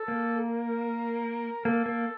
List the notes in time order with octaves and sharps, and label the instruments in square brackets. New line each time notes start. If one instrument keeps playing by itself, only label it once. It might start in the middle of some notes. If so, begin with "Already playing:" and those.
Already playing: [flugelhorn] A4
[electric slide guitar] A#3
[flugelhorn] A#4
[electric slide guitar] A#3 [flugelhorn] A4
[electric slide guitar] A#3